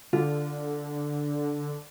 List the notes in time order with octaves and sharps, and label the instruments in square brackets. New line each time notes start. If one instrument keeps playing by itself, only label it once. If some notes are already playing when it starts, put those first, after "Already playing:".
[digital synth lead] D3 [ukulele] F4